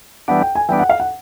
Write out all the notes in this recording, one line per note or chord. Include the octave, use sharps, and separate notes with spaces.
E3 G3 B3 D4 F#5
G5
G#5
E3 G3 B3 D4 G5
F#5
F5
F#5